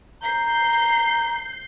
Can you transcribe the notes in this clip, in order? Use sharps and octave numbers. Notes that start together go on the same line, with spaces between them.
A#5 G6 C7